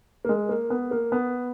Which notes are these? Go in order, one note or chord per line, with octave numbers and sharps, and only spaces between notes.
A#3
G#3
A#3
B3
A#3
B3